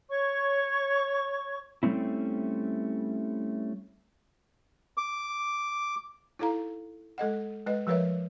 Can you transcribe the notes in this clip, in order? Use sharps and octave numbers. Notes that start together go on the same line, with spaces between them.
C#5 C#6
G3 A3 C4 C#4 E4
D6
D#4 E4 A4 F5 A#5
G#3 A4 D#5 F#5
G#3 B4 D#5
F3 G3 A#4 B4 C#5 E5